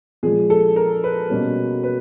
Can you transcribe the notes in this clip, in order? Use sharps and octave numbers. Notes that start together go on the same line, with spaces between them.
A#2 F3 G#3 G#4
A4
A#4
B4
B2 G3 A#3 C#4
B4